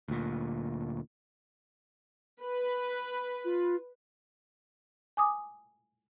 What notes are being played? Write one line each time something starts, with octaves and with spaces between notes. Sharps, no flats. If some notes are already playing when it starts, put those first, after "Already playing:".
D2 A#2
B4
F4
G#5 D6 D#6